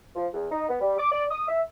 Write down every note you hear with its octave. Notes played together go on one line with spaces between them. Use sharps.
F3
E2
D#4
B3
G3
D6
D5
D#6
E5